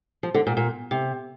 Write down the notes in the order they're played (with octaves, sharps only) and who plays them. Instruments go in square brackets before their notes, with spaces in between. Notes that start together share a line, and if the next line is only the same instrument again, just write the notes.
[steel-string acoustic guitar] F3
D3
A#2
A#2
C3